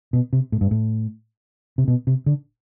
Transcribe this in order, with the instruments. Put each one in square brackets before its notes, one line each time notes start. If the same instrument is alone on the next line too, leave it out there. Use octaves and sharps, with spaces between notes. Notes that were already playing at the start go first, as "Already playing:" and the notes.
[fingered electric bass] B2
C3
A2
G2
A2
C3
B2
C3
D3